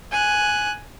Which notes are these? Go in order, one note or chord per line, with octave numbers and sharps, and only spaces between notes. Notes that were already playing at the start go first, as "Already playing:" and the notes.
G#5 F#6